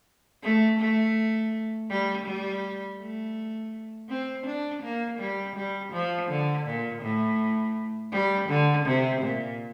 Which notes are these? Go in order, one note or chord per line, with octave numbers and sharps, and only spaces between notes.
A3
A3
G3
G3
A3
C4
D4
A#3
G3
G3
F3
D3
A#2
A2
G3
D3
C3
A#2